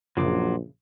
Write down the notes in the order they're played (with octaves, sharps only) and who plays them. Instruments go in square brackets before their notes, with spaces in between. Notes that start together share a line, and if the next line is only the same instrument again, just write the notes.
[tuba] A#1 [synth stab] F#2 C#3 [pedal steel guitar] F#3 F4 D6